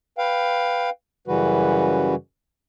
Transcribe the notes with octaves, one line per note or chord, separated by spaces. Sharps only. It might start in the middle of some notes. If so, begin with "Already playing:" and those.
B4 F5 G5
F#2 C#3 E3 G3 F#4 B4